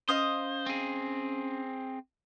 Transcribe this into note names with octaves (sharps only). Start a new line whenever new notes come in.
C#4 C5 D#5 F5 D#6
C4 G#4